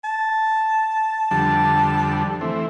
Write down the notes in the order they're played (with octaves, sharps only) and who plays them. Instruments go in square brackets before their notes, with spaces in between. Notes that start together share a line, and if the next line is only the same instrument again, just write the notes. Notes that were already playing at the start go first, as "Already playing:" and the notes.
[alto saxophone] A5
[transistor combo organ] F2 D3 G3 [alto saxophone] A5
[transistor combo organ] E3 C4 [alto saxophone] A3